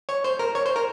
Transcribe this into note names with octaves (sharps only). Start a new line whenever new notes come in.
C#5
C5
A#4
C#5
C5
A#4